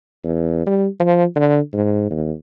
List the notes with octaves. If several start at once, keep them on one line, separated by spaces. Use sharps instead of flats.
E2
G3
F3
D3
G#2
D#2